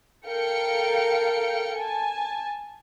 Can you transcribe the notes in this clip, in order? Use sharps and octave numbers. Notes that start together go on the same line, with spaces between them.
A4 A#4 F5 G5 C#7
G#5 A5